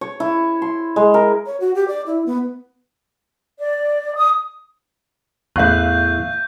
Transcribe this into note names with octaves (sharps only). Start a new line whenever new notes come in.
C#5
E4
C6
G#3
A#4
C#5
F#4
G4
D5
E4
B3
D5
D#6
E2 A2 E5 F5 C#6 F#6 G6